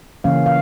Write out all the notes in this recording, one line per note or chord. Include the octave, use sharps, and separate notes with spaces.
C#3 E3 A#3 C#4 F5
F5